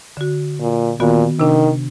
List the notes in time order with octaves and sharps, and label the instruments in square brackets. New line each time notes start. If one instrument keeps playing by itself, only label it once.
[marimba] D3 F#4
[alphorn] A#2
[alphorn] A#2 [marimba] D#3 B3 F#4
[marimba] C3 D4 [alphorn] D#3